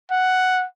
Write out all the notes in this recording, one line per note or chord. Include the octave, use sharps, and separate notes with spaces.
F#5